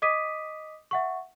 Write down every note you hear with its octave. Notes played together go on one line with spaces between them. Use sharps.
D#5 D6 D#6 B6 D#7
E5 F#5 C#6